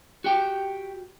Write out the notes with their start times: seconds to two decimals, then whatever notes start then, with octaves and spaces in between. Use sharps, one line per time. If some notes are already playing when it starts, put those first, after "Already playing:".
0.24 F#4 G4 G5